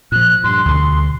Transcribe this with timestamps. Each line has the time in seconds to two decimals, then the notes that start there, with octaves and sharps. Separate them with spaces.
0.12 A#2 F3 F#6
0.44 G2 C6
0.65 D2 B2 D3